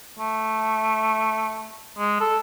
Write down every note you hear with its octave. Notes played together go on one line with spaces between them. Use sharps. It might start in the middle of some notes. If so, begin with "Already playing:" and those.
A3
G#3
A4